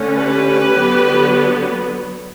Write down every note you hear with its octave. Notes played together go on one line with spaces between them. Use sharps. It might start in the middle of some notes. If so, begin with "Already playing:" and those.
Already playing: D3 A3 C#4
G4 B4
D3 F#3 B3